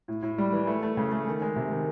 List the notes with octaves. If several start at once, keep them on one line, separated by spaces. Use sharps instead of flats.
A2
A2
G3
E3
A3
A3
C#3
A3
D#3
G#3
C3
D#3